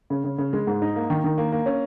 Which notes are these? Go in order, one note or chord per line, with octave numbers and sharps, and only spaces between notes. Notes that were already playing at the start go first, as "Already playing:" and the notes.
C#3
C#3
C#3
G#3
G#2
D#4
A#3
D#3
D#3
A#3
A#3
C#4